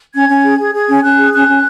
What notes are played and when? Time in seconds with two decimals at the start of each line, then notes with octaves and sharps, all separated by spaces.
0.14 C#4 G#6
0.30 C#4
0.44 G#4
0.58 G#4
0.74 G#4 G#6
0.89 C#4
1.03 C#4 F#6
1.19 G#4
1.33 C#4 F#6
1.48 C#4